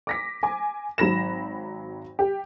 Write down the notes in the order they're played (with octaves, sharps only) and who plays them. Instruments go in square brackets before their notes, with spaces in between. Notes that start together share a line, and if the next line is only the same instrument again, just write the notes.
[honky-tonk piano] D6 A#6 B6
G#5 D6
G#1 F#3 B5 A#6 E7
G4